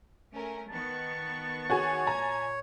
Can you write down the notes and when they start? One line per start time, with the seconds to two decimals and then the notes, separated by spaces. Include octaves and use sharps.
0.34 A3 C#4 A#4
0.69 D#3 B3 A5 C#6
1.70 F#4 G#4 C#5 G#5
2.07 A#2 G#5 A#5 G#6